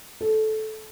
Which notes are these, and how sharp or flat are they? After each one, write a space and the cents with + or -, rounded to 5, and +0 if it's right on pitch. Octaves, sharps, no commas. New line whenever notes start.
A4 -15